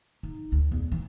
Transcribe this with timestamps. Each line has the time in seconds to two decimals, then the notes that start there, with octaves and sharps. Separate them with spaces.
0.23 D#4
0.52 D2
0.72 E2
0.92 E3